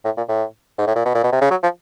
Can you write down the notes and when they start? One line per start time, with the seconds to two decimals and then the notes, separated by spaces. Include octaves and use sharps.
0.05 A2
0.17 A#2
0.29 A2
0.78 G#2
0.87 A2
0.96 A#2
1.05 B2
1.14 A#2
1.23 B2
1.32 C3
1.41 C#3
1.51 F#3
1.63 F3